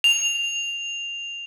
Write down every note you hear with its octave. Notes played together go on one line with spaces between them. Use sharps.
F7